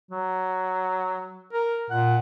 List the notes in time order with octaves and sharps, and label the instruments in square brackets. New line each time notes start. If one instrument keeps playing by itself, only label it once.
[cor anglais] F#3
[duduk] A#4
[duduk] A#2 [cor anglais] F#5